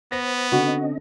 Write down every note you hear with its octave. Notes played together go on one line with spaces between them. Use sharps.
B3 C5 A#6
D3 C4 C#4 F#4 D#5